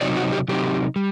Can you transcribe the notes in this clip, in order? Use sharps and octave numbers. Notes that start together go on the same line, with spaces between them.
C3 F#3 C4 D#4 D5
F#4
G4
C3 F#3 C4 D#4 G4
G3